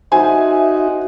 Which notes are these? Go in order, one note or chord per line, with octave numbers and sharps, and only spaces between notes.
D#4 F#4 C5 E5 G#5